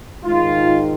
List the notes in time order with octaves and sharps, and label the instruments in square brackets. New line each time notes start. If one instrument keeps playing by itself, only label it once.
[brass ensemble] G#2 D#3 F4